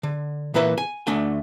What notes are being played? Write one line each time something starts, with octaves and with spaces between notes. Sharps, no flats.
D3
A#2 E3 A#3 B4 E5
G#5
D2 A3 D4 G#5